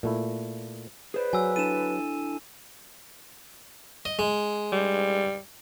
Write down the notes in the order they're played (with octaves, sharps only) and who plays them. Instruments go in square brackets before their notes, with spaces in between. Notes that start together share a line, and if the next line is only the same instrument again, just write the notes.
[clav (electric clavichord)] A#2 A3 E4
[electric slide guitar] G#4 C5 D5 [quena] B4
[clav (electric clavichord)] F#3 [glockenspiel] G#5 E6
[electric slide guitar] D4 E4 A4 [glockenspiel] D#7 E7
[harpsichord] D#5
G#3
[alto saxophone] G3